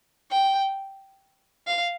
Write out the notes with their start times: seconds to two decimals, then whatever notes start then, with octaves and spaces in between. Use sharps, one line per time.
0.31 G5
1.67 F5